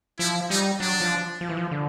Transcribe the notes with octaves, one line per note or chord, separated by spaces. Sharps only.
F3 E4
G3 D#4
F#3 D4
F3
F3
E3
F3
D3